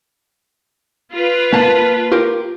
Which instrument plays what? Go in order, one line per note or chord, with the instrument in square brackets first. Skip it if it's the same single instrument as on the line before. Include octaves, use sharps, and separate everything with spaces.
[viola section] F4 B4
[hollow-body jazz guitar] A#3 A5
F4 G4 A#4